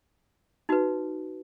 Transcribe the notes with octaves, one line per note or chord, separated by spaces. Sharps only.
D#4 F#4 B4